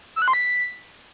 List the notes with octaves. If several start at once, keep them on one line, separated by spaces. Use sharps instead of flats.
E6
F#6
C6
B6